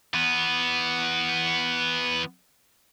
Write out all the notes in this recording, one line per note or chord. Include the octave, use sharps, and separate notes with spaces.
E3 B3